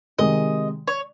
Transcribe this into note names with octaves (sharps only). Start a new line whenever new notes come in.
C3 D#3 G#3 D#5
C#5